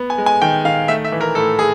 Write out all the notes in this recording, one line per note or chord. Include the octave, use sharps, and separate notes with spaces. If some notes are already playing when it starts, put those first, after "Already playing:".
Already playing: B3
G#5
G#3
G#5
D#3 G5
D#3 F5
A3 E5
E5
E3
A#4
A2 A4
G#4